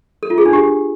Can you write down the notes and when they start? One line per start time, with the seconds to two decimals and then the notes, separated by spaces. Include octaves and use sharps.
0.23 A4
0.30 F4
0.38 G#4
0.45 D4
0.53 G4